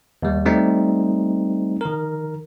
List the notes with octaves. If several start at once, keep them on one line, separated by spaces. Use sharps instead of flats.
D#2 G3
G3 A3 C4 D#4
D#3 A#4